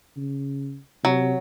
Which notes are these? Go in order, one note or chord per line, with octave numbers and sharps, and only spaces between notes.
C#3
C3 F#3